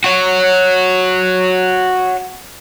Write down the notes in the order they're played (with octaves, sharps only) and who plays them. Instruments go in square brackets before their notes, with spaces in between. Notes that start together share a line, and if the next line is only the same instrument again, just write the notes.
[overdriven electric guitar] F#4 C#5